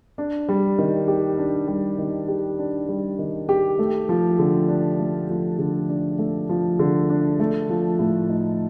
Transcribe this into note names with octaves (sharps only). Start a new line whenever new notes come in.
D4
G3
D#3
G4
D4
G3
D#3
G4
D4
G3
D#3
G4
A3
F3
D3
D4
A3
F3
D3
D4
A3
F3
D3
D4
A3
F3
A2
D#4